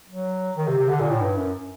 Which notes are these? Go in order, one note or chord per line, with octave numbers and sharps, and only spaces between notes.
F#3
D#3
C3
C3
D3
A#2
A2
G2
F#2